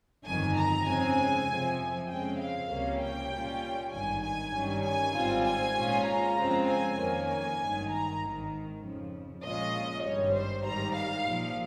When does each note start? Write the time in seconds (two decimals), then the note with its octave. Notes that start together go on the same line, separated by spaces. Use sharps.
0.25 G1 F2 D#3 G#5
0.55 A#5
0.85 F2 C#3 G#3 C4 G#5
1.47 F2 C3 F3 C4
2.08 F2 C#3 G#3 C4 G5
2.39 F5
2.69 C#2 C3 G3 A#3 C#4
3.00 G5
3.30 A#2 G3 C#4 F4
3.91 G#1 G2 D#3 G#5
4.22 G#5
4.52 G2 D#3 G3 C#4
4.83 G#5
5.13 G#1 G#2 G3 C4 F4
5.44 G#5
5.75 A#2 G#3 C#4 F4
6.05 A#5
6.36 F2 C#3 G#3 C4 F4
6.67 G#5
6.97 F2 D#3 A#3 C#4
7.28 G#5
7.58 G#1 G2 D#3
7.89 A#5
8.20 G#1 G#2 D#3
8.81 F2 C#3 F3
9.42 A#1 A#2 G#3 C#4 F4 D#5
10.03 G#1 G2 G3 C#5
10.33 C5
10.64 G#2 D#3 G3 A#5
10.95 F5
11.25 A#1 A#2 F3